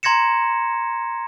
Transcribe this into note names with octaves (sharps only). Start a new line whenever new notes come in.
A#5 C6 G#6 A#6 C#7 E7